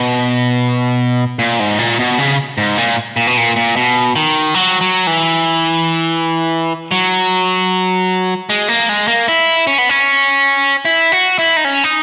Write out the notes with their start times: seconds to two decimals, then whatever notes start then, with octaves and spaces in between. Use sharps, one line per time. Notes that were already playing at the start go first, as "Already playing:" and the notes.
Already playing: B2
1.39 A#2
1.60 G#2
1.79 A#2
1.99 B2
2.18 C#3
2.58 G#2
2.77 A#2
3.16 A#2
3.27 B2
3.37 A#2
3.56 A#2
3.76 B2
4.16 D#3
4.54 F#3
4.81 F#3
5.07 E3
6.91 F#3
8.50 G#3
8.68 A#3
8.89 G#3
9.08 A#3
9.28 E4
9.67 C#4
9.78 B3
9.89 C#4
10.85 E4
11.12 F#4
11.39 E4
11.57 D#4
11.65 C#4
11.84 D#4